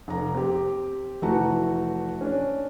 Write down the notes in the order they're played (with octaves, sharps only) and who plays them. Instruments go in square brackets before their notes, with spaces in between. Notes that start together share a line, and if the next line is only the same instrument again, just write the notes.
[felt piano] F1 A#5
C4 G4
F1 E3 A3 F#4 A5 A#5
C#4 D4